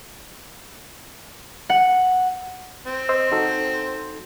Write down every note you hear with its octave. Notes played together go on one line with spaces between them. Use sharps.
F#5
C4
C5 D#5 E6
D#4 F#4 A4